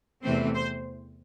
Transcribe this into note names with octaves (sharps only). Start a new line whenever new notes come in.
E2 C3 E3 A3 C4 C5
C5